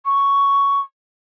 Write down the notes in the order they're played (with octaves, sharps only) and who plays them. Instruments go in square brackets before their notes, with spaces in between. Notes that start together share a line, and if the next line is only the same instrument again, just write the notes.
[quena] C#6